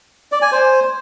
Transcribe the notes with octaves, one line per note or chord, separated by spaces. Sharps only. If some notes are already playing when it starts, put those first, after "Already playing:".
D5
G#5
C5